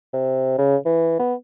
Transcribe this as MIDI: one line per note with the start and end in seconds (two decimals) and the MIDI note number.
0.13 0.55 48
0.58 0.76 49
0.85 1.16 52
1.19 1.34 59